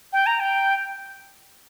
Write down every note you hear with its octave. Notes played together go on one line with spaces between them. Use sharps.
G5
A#5
G5